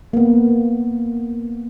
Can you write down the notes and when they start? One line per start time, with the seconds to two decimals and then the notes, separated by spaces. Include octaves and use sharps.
0.13 A#3 B3